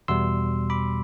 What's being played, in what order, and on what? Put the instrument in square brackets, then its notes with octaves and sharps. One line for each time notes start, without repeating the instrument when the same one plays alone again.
[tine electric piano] E2 B2 G3 C6 E6
B5 D6